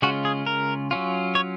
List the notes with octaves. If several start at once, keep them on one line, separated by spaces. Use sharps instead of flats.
C#3 G#3 C#4 F4 F#4
G#4
A#4
F#3 C#4 F4
C#5